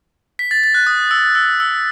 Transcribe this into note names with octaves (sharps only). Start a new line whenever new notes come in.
B6
A6
A6
F#6
D#6
E6
E6
E6